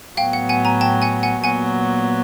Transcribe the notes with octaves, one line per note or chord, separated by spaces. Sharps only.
A2 F#3 B3 F5 G5
F#5
F#5 G#5
G#5 A#5
G5 A5
F#5 G#5
F#5 G#5
A#2 F#3 B3 F#5 G#5